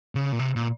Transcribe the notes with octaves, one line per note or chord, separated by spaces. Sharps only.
C#3
A#2
C3
A#2